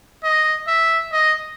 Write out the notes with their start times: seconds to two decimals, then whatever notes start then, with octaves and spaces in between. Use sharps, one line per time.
0.24 D#5
0.67 E5
1.13 D#5